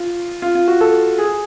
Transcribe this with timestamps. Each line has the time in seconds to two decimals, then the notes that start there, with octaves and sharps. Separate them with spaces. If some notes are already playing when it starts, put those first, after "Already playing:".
Already playing: F4
0.42 F4
0.55 F4
0.68 F#4
0.81 A4
1.18 G#4